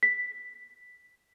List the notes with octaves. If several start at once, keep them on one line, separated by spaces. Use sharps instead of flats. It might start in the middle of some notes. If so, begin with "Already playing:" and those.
B6